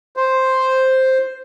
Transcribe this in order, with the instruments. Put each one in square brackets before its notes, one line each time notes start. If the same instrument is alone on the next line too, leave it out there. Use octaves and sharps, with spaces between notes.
[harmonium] C5